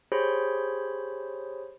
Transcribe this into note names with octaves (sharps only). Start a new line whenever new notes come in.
G4 G#4 C5 C#5 B5 G6